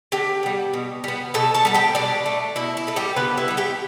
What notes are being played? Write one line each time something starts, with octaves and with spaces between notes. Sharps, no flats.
D3 G4 G5
G3 B3
B2
G3 B3
B2 A4 A5
A4 A5
G3 B3
G4 G5
B2 D4 D5
A3
B2 E4
E4
A3 A4
G3 G4
D3 B3 B4
E4 E5
G3 B3
G4 G5